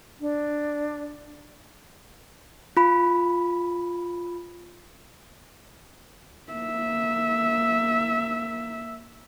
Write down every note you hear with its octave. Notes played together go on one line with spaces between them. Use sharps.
D4
F4 B5
A#3 E5